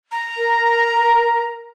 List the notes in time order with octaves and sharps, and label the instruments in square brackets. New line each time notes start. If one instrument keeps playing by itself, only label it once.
[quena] A#5
[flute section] A#4